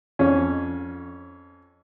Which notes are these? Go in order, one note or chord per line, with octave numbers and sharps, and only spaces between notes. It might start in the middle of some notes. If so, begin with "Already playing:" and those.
F2 C#4